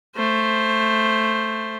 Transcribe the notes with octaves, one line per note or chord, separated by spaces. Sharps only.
A3 C5